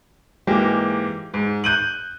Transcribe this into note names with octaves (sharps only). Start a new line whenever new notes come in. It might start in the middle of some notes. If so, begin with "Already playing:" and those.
G#2 E3 G#3 A#3 G4
G#2
F#6 G6 D#7 F#7